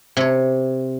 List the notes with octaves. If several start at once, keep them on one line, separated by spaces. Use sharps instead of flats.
C3 C#5